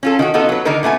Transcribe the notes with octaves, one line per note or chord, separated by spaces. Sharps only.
C#4 F4 A4
D#3 C#4 F#4
B3 D#4 F4 F#4 A4
F#3 B4
D3 D#3 B3 D#4 A#4
A#2 A3 B3 G#5